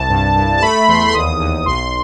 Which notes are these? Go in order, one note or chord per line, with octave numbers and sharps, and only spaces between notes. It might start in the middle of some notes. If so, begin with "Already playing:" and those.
Already playing: C2 A5
G2
G2
A5
A3 B5
E2 C6
C6
D#2 D#6
D#2
B1 C6